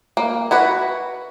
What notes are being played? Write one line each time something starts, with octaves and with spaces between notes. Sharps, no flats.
A#3
E4 F#4 B4